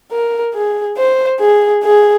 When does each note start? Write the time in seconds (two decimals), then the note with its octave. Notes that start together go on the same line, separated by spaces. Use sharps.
0.12 A#4
0.55 G#4
0.97 C5
1.41 G#4
1.83 G#4